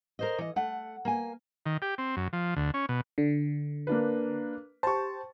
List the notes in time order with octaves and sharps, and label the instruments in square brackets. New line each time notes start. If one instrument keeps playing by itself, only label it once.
[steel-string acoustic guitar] A#4 C5 D#5
E3 D#5
A3 F#5
A#3 G#5
[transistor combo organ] D#3
G4
C4
F#2
F3
D2
C#4
B2
[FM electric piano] D3
[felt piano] A#3 D4 B4
[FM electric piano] G4 C5 [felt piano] A5 C#6